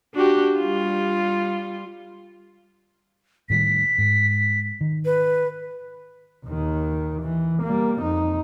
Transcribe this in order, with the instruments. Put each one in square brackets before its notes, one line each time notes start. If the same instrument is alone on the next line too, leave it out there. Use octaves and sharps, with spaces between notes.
[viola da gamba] D4 F#4 G4
G3 F4
[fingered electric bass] A2 D#3 G3 [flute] B6
[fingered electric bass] G#2
D#3
[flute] B4
[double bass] D#2 D#3
E3
G3 A#3
F2 D#4